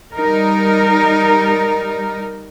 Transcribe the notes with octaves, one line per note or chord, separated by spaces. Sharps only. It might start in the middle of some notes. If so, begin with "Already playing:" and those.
G3 D#4 A#4